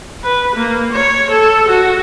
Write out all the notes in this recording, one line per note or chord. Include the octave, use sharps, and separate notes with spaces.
B4
A#3
C#5
A4
F#4